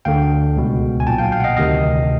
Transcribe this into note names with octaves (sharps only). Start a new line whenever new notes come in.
D2 D3 F5 G5
C#2 B2
G#5
B1 A#2 G5 A5
F5 G5
F5 G5
F#5
D#5 F5
D2 C3 D#3 D#5 F5